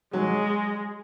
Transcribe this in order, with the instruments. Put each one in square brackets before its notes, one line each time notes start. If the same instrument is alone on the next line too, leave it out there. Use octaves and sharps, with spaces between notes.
[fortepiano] F#3 [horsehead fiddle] G#3